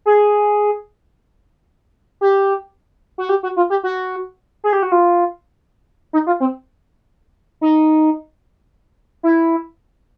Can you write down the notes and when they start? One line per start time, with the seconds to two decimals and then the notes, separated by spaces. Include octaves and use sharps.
0.06 G#4
2.21 G4
3.18 F#4
3.29 G4
3.43 F#4
3.56 F4
3.70 G4
3.83 F#4
4.64 G#4
4.73 G4
4.83 F#4
4.92 F4
6.13 D#4
6.27 F4
6.40 C4
7.61 D#4
9.23 E4